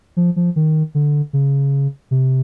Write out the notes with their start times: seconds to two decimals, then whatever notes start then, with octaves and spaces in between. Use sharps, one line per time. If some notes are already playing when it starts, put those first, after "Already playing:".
0.17 F3
0.36 F3
0.56 D#3
0.95 D3
1.33 C#3
2.11 C3